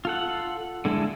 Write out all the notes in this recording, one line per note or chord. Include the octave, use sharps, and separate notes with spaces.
F4 A4 F#5
D3 G#3 E4 A4